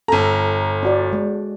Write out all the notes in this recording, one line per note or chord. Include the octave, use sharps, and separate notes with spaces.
G1 A4 A#5
D4 F#4 D5
G#3